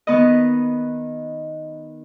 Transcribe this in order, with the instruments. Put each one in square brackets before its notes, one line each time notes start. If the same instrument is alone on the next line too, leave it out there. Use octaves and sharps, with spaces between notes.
[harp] D#3 B3 B4 D#5